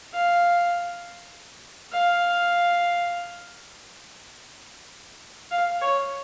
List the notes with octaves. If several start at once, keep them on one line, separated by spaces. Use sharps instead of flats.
F5
F5
F5
C#5